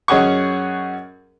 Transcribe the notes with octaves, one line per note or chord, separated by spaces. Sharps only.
F#2 C#4 G#4 D#5 F#5 C#6